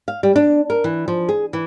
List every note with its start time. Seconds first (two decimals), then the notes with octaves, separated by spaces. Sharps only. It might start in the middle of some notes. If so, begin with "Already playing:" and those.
0.08 F5
0.23 G3
0.36 D4
0.70 A#4
0.84 E3
1.08 F3
1.29 G#4
1.53 E3